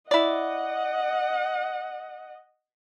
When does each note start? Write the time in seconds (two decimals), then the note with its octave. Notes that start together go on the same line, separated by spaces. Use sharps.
0.11 E4 D5 D#5 F#5